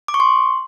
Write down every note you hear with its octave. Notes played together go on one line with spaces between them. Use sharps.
D6
C#6
C6